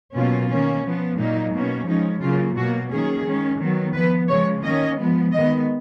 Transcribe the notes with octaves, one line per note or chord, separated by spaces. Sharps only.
B2 F#3 A#3 C#4 F4
D#3 A#3 C#4
F3 B3
A#2 F#3 A#3 D#4
B2 A#3 C#4
F3 G#3 C#4 D#4
C#3 F#3 A#3 F4
B2 F#3 A#3 F#4
D#3 F#3 A#3 C#4 G#4
D#3 G#3 C#4
D#3 F#3 B3
F3 B3 B4
C#3 F3 G#3 C#5
D#3 A#3 C#4 D#5
F3 G#3 B3
D#3 G#3 B3 D#5